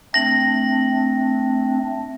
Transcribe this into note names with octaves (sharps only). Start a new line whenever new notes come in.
A3 C4 D4 A#6 F#7